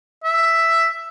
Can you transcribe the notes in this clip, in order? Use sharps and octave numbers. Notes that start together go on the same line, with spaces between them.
E5